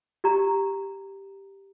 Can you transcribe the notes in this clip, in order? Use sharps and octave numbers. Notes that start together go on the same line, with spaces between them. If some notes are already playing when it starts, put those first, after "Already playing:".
G4 A#5